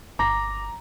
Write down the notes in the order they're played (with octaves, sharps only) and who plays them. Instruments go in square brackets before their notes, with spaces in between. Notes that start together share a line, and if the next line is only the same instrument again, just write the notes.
[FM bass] G1 [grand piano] A#5 [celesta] D6 A#6